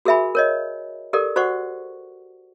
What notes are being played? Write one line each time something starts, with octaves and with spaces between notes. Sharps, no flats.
F#4 G#4 A#4 E5 G#5 B5
A#4 C#5 D#5
G4 A4 A#4 D5
F#4 C5 D5 F#5 C#6